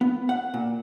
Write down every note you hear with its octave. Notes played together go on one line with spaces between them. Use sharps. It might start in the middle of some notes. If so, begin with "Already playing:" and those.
B3
F#5
A#2